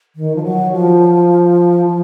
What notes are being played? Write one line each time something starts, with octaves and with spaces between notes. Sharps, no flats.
D#3
F3
F#3
F3
F3